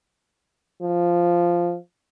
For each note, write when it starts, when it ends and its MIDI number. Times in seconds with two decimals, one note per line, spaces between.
0.82 1.77 53